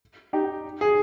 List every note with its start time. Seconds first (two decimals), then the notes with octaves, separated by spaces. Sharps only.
0.33 D#4 G4
0.81 G#4